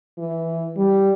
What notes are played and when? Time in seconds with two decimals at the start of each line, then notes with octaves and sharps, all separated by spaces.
0.18 E3
0.77 G3